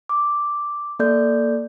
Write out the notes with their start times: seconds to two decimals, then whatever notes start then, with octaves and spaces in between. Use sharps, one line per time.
0.09 D6
0.99 A#3 A4 D5 G6